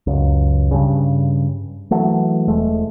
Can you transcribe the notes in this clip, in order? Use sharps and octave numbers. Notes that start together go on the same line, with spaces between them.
C#2 F#2
G2 C#3
E3 F#3 A3
E1 G#3 A3